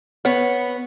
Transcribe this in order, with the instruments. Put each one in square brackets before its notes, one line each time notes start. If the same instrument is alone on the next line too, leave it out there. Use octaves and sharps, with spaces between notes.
[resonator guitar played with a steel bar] B3 C#5